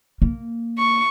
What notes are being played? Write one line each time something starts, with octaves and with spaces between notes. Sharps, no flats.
A#3
C#6